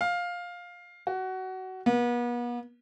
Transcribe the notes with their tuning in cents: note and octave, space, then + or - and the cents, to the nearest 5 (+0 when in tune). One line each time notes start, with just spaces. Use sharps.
F5 +10
F#4 +20
B3 -40